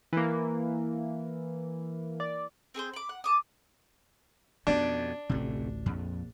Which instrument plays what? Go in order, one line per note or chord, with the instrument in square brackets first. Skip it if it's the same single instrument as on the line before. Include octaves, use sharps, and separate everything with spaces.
[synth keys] E3 A#3
D5
[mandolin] C4 G#4 A#4 C5
B5 D6
F#5
A5 D6 D#6
[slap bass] F2 B2 [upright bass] B3 C#4 [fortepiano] D4
[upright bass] A1 D2 [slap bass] C3 A3
[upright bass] A#1 [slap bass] F2